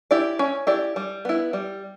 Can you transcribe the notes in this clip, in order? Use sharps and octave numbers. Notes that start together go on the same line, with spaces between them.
E4 G4 D5
C#4
E4 G4 D5
G3
B3 E4
G3